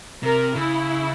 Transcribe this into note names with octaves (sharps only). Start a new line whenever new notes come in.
C3 A#4
C#3 E4